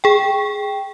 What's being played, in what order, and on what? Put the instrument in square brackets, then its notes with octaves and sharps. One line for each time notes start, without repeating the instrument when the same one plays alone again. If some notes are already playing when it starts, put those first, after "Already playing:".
[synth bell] G#4 G5